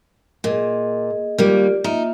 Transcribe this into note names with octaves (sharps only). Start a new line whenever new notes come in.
A#2 G#4 D#5
D#2 G3 A#3 F4 G4 D5
A#3 D#4 F4 E5